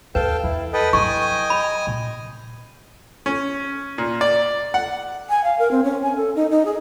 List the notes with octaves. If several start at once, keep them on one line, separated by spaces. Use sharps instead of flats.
D#2 A4 B4 F5 G5
E2 E4
A4 B4 D#5 G5
F#3 E4 D#5 G#5 C#6
B5
A#2
C#4
A#2
D5
F#5
G#5
F5
A#4
C4
C#4
G#5
A4
D#4
D#4
G#4